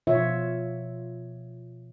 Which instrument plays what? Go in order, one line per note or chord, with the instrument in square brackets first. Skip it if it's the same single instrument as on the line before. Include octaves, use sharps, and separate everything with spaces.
[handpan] B2 F3 F4 C#5 E5